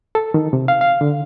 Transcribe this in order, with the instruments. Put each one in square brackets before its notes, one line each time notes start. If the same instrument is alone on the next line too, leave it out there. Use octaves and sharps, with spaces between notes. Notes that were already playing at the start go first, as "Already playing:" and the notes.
[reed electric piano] A4
D#3
C3
F5
F5
D3